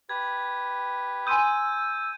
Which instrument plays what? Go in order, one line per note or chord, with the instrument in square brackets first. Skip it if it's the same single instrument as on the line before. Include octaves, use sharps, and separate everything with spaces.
[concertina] G4 B4 [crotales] G#6
[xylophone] G#5 C6 D#6 [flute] E6 [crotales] G6 D#7